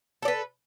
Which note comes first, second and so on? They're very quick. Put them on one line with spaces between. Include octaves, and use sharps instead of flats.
A4 D5 B4